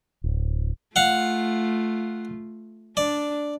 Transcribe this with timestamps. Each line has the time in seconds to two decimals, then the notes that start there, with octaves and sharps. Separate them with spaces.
0.24 D1
0.96 A3 F4 F5 F#5
2.97 D4 D5